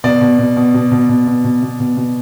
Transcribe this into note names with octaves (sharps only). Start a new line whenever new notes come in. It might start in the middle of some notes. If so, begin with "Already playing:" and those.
B2 D5
B2
B2
B2
B2
B2
B2
B2
B2
B2
B2
B2